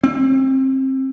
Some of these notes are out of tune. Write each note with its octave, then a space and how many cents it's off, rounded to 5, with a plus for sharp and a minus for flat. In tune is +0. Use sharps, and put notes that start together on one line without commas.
C4 +25